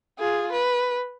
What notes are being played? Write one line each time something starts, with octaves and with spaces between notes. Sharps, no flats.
F4 G#4
B4